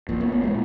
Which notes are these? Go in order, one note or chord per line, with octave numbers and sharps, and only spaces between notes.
A#1 A#2
B3
B3
A#2 G#3